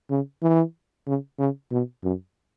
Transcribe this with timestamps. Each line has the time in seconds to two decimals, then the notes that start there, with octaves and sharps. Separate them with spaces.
0.10 C#3
0.42 E3
1.07 C#3
1.39 C#3
1.71 B2
2.03 F#2